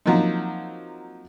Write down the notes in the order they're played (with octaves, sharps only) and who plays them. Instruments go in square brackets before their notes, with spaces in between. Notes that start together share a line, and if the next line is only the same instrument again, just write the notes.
[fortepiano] F3 F#3 A#3 C4 D#4